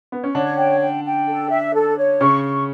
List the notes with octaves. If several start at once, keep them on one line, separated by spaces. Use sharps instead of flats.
B3
C#4
D3 D4 C#5
G5
G5
G5
A4
E5
A4
C#5
C#3 C#4 C#6
C#6